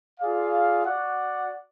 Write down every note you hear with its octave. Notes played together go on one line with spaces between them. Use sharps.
F4 G#4 D5 F5
F#4 D5 F#5